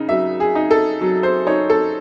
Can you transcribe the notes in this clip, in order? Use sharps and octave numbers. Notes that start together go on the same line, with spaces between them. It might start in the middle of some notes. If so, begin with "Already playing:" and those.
Already playing: C#3 D#4
F#3 E5
G#4
D#4
A4
F#3
C5
D#4 C#5
A4